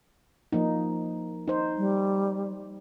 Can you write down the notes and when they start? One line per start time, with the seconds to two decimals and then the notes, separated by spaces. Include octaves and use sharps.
0.52 F3 A#3 D#4
1.48 D#4 C5
1.77 G3